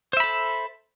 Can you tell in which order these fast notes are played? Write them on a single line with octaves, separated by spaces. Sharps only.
C5 E5 B5 A4